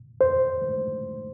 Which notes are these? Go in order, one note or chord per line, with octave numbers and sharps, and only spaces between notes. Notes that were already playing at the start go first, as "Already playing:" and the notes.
C5